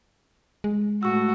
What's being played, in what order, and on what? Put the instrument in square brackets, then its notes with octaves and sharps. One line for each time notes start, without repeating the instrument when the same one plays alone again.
[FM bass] G#3
[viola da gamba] A2 F#4 [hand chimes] C#6 E6